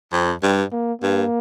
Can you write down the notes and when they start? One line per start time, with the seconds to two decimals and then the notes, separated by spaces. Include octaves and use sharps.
0.13 F2 C4
0.43 G2 G3
0.72 A#3
1.02 G2 A#3